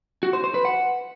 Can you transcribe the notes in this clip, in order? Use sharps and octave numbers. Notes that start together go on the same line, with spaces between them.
F#4
C5
C5
B4
F#5